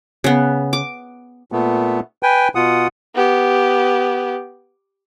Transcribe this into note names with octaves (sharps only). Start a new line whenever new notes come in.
C#3 B3
D6
A#2 A3 B3
B4 G5 G#5
B2 F4 F#5 D#6
B3 G4